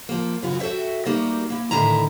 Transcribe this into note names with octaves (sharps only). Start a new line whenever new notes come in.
F3 A#3
F#2 C#3 E3 F4 F#4
F#4 A4 C#5 E5 G5
G3 A3 A#3 D#4 F#4
A#3 E4
A2 D3 D#3 E4 A#5